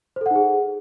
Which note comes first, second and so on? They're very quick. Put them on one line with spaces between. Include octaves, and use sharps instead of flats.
C5 A4 F#5 D#4 G#4